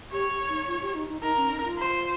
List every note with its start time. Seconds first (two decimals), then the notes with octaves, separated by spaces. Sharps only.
0.12 G4 C#5
0.49 D#4
0.67 F4
0.82 G4
0.95 D#4
1.09 D#4
1.22 D#4 A#4
1.37 C#4
1.51 D#4
1.64 F4
1.78 C5